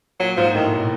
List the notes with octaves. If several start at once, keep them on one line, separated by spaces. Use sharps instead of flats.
A#2 F#3
G#2 F3
A2 D#3
B2